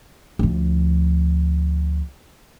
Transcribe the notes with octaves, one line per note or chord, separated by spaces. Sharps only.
D2 F3